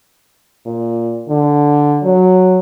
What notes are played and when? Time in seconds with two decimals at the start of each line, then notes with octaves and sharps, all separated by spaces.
0.66 A#2
1.29 D3
2.03 F#3